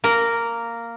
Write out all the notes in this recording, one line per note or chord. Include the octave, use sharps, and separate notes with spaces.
A#3 A#4